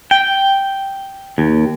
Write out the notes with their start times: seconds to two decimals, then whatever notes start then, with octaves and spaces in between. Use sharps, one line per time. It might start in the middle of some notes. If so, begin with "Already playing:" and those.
0.11 G5
1.38 D#2